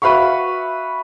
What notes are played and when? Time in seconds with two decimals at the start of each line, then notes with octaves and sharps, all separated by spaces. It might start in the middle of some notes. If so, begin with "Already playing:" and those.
0.02 F#4 B4 E5 F5 B5 C#6